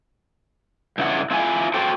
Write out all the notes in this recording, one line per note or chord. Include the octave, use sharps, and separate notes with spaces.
G2 C#3 E4 G#4 F#5
C4 E4 F4 G#5
F#4 A4 C5 G5